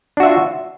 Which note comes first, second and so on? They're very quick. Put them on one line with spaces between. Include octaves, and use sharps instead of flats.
D4 F#4 E5 F4